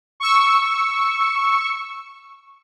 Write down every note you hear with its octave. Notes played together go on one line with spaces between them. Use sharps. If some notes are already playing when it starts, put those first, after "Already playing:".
C#6 E6